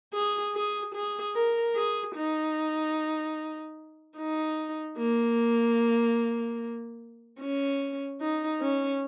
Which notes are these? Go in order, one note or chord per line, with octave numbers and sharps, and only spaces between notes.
G#4
G#4
G#4
A#4
G#4
D#4
D#4
A#3
C#4
D#4
C#4